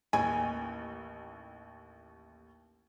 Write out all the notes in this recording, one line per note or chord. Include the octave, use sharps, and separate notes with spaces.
A1 D#2 G#5